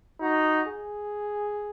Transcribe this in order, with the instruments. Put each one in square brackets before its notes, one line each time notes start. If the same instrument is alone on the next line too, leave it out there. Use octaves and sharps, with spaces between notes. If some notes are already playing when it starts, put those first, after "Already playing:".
[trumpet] D#4 [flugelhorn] F#4
[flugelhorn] G#4